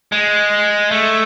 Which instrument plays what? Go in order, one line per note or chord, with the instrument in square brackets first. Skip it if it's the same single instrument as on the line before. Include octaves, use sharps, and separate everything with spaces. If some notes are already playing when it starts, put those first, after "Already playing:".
[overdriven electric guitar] G#3
A3